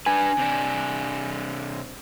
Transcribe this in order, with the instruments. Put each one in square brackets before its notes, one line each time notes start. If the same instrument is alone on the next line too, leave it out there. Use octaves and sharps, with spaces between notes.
[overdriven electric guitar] D4 B4 [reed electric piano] G#5
[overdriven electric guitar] C3 D4